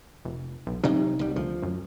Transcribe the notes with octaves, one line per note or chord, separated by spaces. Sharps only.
F1
B1
C3 F#3 G3 D#4
C2 G3
D2 F3
F#2